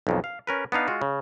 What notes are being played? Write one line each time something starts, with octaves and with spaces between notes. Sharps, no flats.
B1 F2 D#3
F5
C#4 A#4 B4
B3 D4 D#4 F5
G#3 F4 F#4
C#3